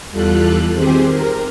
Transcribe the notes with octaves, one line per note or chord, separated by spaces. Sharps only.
E2 G3 F4 A4 F#6
D#3 C4 G4 G#4 C5
A#4